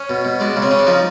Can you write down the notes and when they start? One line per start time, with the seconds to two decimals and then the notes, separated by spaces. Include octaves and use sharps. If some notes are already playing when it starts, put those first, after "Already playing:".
Already playing: C#4
0.09 B2
0.25 B2
0.40 G#3 D4
0.56 C#3
0.62 C4
0.71 C#3 C#4
0.79 D4
0.87 F3 D#4